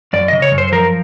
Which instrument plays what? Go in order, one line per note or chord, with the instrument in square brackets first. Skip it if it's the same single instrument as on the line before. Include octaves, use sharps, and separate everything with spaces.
[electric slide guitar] F#2 D5
C#3 D#5
C#5
F#2
C5
F3 A#4